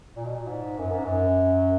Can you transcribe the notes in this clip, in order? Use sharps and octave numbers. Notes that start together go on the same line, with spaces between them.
A#2
B2
A#2
G#2
F#2
G#2
F#2